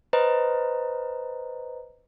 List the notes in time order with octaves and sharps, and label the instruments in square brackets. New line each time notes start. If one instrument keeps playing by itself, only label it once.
[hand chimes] B4 C5 D#5 A#5